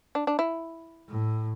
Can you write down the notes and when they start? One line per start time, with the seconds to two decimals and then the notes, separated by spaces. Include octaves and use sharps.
0.15 D4
0.27 D4
0.39 E4
1.09 A2